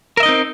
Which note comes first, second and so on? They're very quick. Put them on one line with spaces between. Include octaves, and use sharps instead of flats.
A#4 E5 D#5 D#4 C4